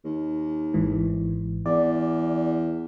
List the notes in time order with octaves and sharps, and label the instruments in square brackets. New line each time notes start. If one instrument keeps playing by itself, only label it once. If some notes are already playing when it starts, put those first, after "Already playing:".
[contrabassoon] D#2
[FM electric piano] G#1 G#2 E3
[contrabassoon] E2 [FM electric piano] D5